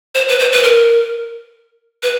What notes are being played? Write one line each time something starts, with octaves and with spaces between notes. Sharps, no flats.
C5
B4
C5
B4
A#4
B4